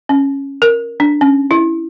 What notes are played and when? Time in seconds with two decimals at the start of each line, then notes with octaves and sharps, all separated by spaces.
0.09 C#4
0.62 A#4
1.00 D4
1.21 C#4
1.51 E4